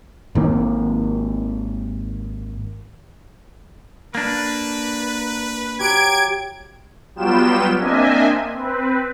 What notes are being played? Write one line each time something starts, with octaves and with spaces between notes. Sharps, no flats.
G#1 D#3 A#3
A#3 D4 B4
F#3 G4 C#6 G#6 D7
F#3 G3 B3 F4 G5 E7
A#3 C4 D4 D#5 E5 G#5
C4 B4